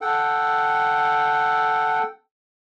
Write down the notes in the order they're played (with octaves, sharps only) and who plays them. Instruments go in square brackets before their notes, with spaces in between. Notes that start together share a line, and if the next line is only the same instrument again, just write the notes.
[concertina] A4 F#5 G5